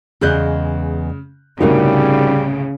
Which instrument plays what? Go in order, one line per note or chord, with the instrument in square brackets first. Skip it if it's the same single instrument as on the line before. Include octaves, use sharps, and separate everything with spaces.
[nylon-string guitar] E2 G#3 D#5 [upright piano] C#3 F#6 G6
[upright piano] G1 C2 A2 [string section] C#3 [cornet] G3 [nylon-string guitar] D#4 F#4 A#4